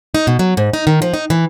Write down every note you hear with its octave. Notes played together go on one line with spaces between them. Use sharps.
D#4
B2
F#3
G#2
D#4
D#3
F3
D#4
E3